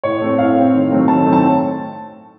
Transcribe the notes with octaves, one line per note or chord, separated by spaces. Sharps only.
A2 C#5
A3 C4
A2 F5
A3 C4
D#3
F#3 A3 C4
D#3 A5
F#3 A3 C4
A5